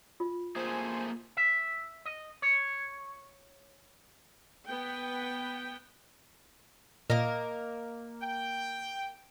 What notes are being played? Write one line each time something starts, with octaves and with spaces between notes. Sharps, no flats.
F4
A3 A#3 G#4 C5 G#5
E5
D#5
C#5
B3 B4 G5
A#2 A#3 A#4 D#5
G5